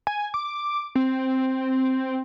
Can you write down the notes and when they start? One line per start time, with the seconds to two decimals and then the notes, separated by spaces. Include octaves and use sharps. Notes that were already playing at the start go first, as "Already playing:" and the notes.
0.07 G#5
0.34 D6
0.95 C4